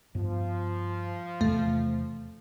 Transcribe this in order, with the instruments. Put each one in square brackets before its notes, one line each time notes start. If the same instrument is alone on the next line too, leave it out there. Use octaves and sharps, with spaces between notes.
[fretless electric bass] G2 B3 [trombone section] F3
[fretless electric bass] E2 C3 E3 [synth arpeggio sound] A3